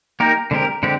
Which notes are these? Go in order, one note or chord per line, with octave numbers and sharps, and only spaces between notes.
A#3 D#4 G4 A#4
D3 G#3 C4 G4 A#4
D3 G#3 C4 G4